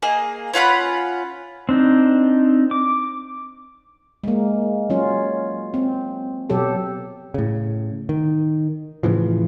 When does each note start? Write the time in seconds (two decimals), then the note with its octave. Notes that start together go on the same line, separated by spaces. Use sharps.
0.02 A#3 G#4 D#5
0.54 C#4 F4 F#5 B5
1.69 C4 D4 D#4
2.71 D6
4.24 G#3 A#3
4.90 F#3 C#4 F4
5.74 C4
6.50 B2 F#3 G4 A4
7.34 A2 C#3
8.09 D#3
9.03 A2 C#3 E3 F3